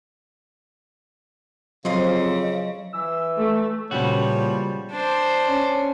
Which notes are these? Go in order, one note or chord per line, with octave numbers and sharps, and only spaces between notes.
F2 C#3 F#3 C5 D#5
E3 E6
A3
A#2 C#3 F3 G3 B3 F#4 C#5
D4 C5
C#4